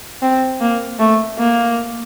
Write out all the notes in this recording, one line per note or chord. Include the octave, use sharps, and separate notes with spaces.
C4
A#3
A3
A#3